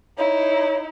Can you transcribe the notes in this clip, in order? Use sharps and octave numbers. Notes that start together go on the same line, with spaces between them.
D#4 E4 C#5